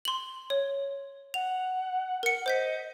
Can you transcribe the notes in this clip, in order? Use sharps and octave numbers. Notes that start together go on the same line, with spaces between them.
C6 F#7
C#5
F#5 F7
A#4 F#5 C#7
C5 D#5 G6 B6